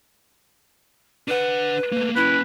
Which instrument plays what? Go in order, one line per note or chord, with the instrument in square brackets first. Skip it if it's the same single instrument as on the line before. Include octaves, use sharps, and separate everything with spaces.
[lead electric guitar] D4 F#5 [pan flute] B4
[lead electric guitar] A3 A#3
[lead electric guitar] A#3 C#4 [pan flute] E4 [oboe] B4